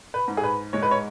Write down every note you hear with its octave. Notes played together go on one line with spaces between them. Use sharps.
B4
G#2
G#4
B4
G#3 C#5
B4
C#5